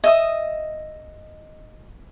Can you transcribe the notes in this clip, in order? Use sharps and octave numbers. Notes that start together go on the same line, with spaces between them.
D#5 E5 D#6